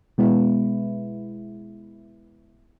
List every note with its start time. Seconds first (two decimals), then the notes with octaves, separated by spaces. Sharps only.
0.18 B2 G#3 B3 E4